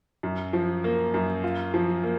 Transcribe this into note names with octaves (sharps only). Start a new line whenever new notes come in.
F#2
F3
A#3
F#2
F4
F3
A#3